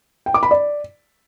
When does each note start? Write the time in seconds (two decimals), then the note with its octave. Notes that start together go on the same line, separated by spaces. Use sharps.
0.26 G5
0.34 D6
0.43 B5
0.51 D5